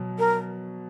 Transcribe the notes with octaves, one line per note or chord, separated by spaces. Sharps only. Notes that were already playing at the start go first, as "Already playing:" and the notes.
Already playing: B2 F#3
A#4